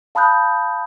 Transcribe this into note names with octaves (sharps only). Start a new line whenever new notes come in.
F5 A5 B5 D#6 F#6 G6